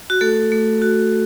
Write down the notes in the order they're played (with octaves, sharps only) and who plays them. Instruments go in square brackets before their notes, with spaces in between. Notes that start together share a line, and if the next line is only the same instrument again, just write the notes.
[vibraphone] F#4
A3 A4
A3
F#4